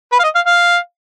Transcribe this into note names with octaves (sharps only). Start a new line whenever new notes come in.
B4
F5
D#5
F5
F5